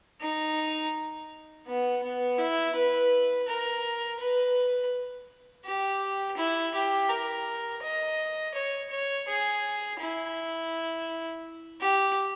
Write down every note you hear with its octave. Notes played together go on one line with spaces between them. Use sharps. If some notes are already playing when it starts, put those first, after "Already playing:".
D#4
B3
B3
E4
B4
A#4
B4
G4
E4
G4
A#4
D#5
C#5
C#5
G#4
E4
G4